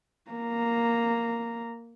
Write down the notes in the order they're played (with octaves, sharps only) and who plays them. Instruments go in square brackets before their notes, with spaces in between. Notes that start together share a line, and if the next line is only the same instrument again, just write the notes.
[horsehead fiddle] A#3 A#5